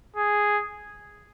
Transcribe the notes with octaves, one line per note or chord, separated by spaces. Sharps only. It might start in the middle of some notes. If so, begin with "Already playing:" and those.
G#4